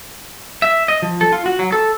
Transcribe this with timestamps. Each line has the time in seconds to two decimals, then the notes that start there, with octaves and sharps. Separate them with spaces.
0.62 E5
0.88 D#5
1.02 F3
1.21 A4
1.32 F4
1.46 F#4
1.59 F#3
1.72 A4